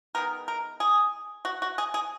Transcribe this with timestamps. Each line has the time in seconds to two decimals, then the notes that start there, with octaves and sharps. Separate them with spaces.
0.15 D#3 G#3 B3 A#4
0.48 A#4
0.80 G#4
1.45 F#4
1.62 F#4
1.78 G#4
1.94 G#4